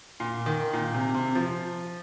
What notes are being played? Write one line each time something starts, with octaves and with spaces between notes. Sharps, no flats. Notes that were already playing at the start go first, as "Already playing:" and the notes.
A#2
D#3
A#2
C3
C3
F3